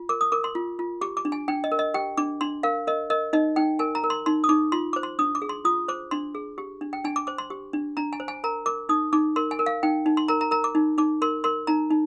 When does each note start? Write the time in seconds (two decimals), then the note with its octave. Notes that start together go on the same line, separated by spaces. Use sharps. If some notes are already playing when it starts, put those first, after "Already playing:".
Already playing: F4
0.09 A#4 D6
0.21 D#6
0.32 A#4 D6
0.44 C6
0.55 F4
0.79 F4
1.01 G4 D6
1.17 D6
1.25 D4
1.32 G#5
1.48 D4 G5
1.64 D#5
1.72 A#4
1.79 D#5
1.94 G4 G5
2.17 D4 D6
2.41 D4 C6
2.63 A#4 F5
2.87 A#4 D#5
3.10 A#4 D#5
3.33 D#4 D#5
3.56 D#4 G5
3.79 A#4 G#5
3.95 A#5
4.04 A#4
4.10 C6
4.26 D#4 C6
4.44 D#6
4.49 D#4 D6
4.72 F4 C6
4.93 C5 D6
5.03 C6
5.19 D4 D#6
5.35 D6
5.42 G#4
5.49 C6
5.65 F4 D#6
5.88 C5 D6
6.11 D4 C6
6.35 G#4
6.58 G4
6.81 D4
6.93 G5
7.04 D4 G#5
7.16 D6
7.27 C5 D6
7.38 C6
7.50 G4
7.73 D4
7.97 D4 A#5
8.13 G#5
8.20 C5
8.28 G#5
8.44 A#4 A#5
8.66 A#4 D6
8.89 D#4 D#6
9.13 D#4 D6
9.36 A#4 C6
9.51 G#5
9.59 A#4
9.66 F5
9.83 D#4 G5
10.06 D#4
10.17 C6
10.28 A#4 A#5
10.41 A#5
10.51 A#4 A#5
10.64 D6
10.75 D#4
10.98 D#4 D6
11.22 A#4 C6
11.44 A#4 C6
11.67 D#4 A#5
11.91 D#4